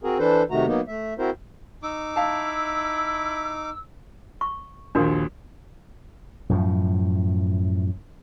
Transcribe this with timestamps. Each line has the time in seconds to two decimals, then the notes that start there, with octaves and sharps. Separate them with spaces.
0.03 C4 F#4 G#4 A#4
0.19 E3 D4 A4 B4 C5
0.50 C3 D#3 A3 F#4 A#5
0.67 F#3 A#3 B3 D#4
0.88 A3 E5
1.19 C4 E4 F#4 A#4 C5
1.83 D#4 D6 E6
2.16 E4 F5 A5
4.41 C#6
4.95 A#1 D#2 D4 F#4 A#4
6.50 F#2 A2 F3